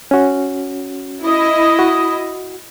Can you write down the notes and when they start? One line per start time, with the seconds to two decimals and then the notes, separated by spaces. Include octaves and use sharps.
0.11 C#4 F#4
1.21 E4 D#5
1.79 F#4